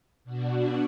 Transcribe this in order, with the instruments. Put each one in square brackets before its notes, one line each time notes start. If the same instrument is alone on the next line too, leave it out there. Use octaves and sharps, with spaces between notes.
[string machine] B2 D4 F#4